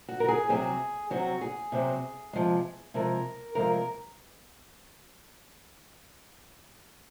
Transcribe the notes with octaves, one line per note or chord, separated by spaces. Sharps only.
F#4
A#4
G#4
C3 F#3 C4 G#4
C3 F#3 C4 F#4
G#4
C3 F#3 C4
C3 F3 G#3
C3 F3 G#3 A#4
C3 F3 G#3 A#4
A#4